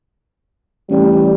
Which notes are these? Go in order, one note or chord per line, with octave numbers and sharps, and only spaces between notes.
A1 G3